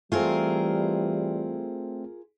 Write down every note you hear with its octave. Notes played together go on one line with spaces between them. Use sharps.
E3 G3 A3 C4 F4 G#4 A#4